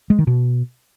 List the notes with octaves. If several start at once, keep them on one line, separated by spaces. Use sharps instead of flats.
G#3
D#3
B2